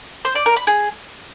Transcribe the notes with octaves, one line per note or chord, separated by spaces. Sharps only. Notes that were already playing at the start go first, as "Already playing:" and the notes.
C5
D5
A#4
B5
G#4